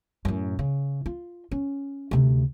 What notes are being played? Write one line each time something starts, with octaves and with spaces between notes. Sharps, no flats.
F#2 A2
C#3
F4
C#4
D2 C3